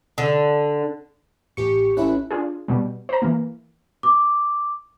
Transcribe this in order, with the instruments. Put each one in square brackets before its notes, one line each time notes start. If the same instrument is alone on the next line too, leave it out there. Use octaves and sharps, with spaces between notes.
[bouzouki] D3
[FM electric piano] A1 C#7 [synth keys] G4 C#6
[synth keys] A1 E5 F#6 [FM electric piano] C#4 E4
[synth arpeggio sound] D4 F4 G#4
B2 G3
C5 A#5
E3 A#3
[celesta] D6